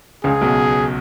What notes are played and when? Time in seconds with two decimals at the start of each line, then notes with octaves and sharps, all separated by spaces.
0.24 C#2 C#3 G#4
0.41 B1 B2